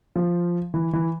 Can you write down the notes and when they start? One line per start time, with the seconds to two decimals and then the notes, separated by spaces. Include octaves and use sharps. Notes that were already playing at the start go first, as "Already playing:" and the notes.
0.16 F3
0.74 E3
0.93 E3